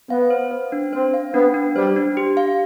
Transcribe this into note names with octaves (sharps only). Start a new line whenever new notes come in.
B3 F5
C5
C5
D4
C4 C5
F5
B3 D4
D4
G3 C5
D4
G4
F5